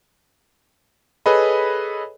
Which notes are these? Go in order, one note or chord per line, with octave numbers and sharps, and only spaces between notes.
G#4 A4 B4 C#5 D#5 B5